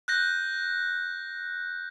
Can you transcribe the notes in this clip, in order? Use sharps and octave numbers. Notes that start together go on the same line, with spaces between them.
F#6 G6 A#6